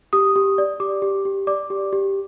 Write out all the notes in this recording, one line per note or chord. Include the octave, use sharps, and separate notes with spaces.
G4 D#6
G4
D5
G4 D6
G4
G4
D5 D6
G4
G4